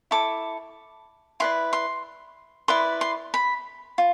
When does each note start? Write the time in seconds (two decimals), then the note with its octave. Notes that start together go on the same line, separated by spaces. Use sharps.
0.11 E4 A4 D6
1.40 E4 B4 D5 C6
1.73 C6
2.68 E4 B4 D5 C6
3.01 C6
3.34 B5
3.98 F4